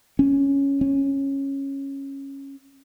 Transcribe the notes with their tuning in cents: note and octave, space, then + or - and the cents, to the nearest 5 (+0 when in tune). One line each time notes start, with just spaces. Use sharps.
C#4 +0
C#4 -10